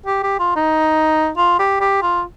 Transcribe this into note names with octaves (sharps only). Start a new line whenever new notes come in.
G4
G4
F4
D#4
F4
G4
G4
F4